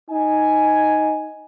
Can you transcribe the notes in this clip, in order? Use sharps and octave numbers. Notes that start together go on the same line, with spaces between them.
D#4 G#5